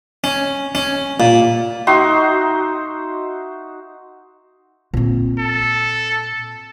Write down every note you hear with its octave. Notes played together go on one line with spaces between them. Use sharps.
C#4
C#4
A#2
D#4 F#4 E5 C6
A#2 C4
A4